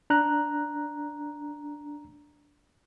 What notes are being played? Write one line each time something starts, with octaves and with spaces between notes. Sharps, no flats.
D4 A#5 F#6